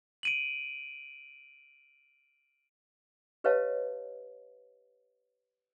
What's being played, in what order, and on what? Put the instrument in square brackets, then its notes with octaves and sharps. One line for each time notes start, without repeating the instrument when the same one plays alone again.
[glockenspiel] D7 D#7 F#7
[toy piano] G4 B4 C#5 D#5 F5 A5